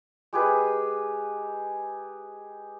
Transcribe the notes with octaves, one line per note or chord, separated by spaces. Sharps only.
G#3 G4 G#4 B4